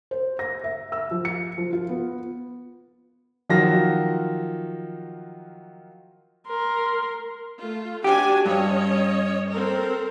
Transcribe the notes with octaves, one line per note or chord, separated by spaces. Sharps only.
C5
A#6
E5
E6
F3
C#7
F3
F4
B3
D#3 F3 F#3 F4 F#4 A#6
A#4 C6
A3 F4
D4 F#4 G4 G#5
G2 C#4 C#5 D#5
C4 A4 A#4